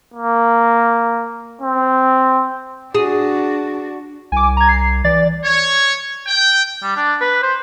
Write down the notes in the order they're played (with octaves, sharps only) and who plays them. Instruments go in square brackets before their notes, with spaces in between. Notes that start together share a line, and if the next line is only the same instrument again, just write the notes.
[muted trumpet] A#3
C4
[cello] D4 F#4 [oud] G#4
[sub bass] C2 [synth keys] G#5 D6
[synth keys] A#5 G#6
C7
[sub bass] E3 [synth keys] D5 A6
[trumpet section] C#5
G5
[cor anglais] G3
D4
B4
C5